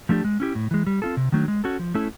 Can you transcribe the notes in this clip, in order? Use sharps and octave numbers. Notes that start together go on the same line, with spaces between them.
F3 A3 D4 G4
G#3
C#4 E4 G4
A2
E3 G#3
G3
C4 F4 A4
C3
D#3 F#3 A3 D4
G#3
C#4 F#4 A4
F3
A3 C#4 E4 A4